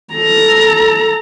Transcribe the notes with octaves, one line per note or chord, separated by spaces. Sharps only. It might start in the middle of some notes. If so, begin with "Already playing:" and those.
A4 A#5